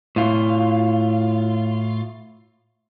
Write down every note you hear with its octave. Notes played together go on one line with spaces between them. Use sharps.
A2 F4